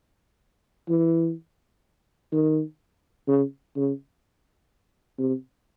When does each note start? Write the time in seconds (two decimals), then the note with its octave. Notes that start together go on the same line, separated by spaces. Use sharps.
0.89 E3
2.32 D#3
3.28 C#3
3.76 C#3
5.19 C3